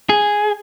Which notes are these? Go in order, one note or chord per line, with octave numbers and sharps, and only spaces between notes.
G#4